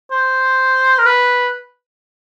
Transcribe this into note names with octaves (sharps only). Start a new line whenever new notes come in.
C5
A#4
B4